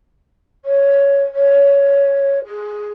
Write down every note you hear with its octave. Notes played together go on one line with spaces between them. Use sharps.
C#5
C#5
G#4